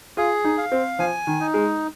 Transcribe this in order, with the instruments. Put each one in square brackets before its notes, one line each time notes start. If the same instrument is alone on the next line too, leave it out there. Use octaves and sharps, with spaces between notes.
[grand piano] F4 [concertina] G#4
[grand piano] D#4
[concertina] F5
[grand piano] C4
[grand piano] F3 [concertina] G#5
[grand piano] D#3
[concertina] D#4
[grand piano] G#3